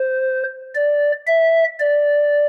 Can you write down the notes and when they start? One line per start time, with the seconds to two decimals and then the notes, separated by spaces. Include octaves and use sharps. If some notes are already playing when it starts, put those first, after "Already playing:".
Already playing: C5
0.75 D5
1.27 E5
1.80 D5